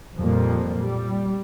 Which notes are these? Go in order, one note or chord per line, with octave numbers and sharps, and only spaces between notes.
F2 A#2 F3 G3 A#3
G3